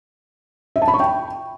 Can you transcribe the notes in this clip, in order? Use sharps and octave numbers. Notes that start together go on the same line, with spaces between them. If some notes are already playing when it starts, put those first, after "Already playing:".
E5
A5
B5
C#6
G5